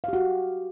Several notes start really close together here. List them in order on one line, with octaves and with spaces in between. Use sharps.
F5 G4 F#4